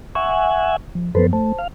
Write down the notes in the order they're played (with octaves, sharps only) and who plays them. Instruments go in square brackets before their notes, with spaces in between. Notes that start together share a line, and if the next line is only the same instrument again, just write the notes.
[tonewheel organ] E5 F#5 G#5 [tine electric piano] C#6
[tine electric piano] F3
[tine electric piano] F#2 F3 B3 [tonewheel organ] A4 B4 C5
[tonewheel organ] A3 [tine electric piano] C5 A5
[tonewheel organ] F5